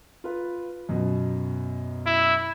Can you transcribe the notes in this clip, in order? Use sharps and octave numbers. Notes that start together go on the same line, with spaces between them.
F4 B4
F#2 B2
E4